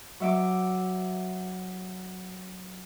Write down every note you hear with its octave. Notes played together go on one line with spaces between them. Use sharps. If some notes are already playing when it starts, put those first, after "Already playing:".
F#3 E5 D6